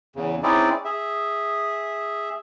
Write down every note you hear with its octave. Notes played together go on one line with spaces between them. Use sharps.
E2 C#3
C4 C#4 D#4 E4 G#4 D5
G#4 E5